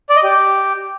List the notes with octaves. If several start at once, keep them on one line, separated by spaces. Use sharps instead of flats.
D5
D#5
G4